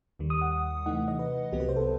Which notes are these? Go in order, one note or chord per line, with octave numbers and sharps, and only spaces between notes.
D#2 D#3 G3
D#6
F#5
C3 E3 A3 D#4 F#5
D#5
B4
C2 C3 F#3 B3 G4
B4
C5
A4